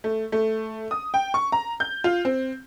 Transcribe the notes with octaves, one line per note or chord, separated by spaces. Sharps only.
A3
A3
D#6
G5
C#6
A#5
G6
F4
C4